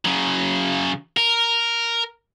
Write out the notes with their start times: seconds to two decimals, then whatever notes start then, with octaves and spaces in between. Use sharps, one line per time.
0.05 C#3 F#3
1.17 A#4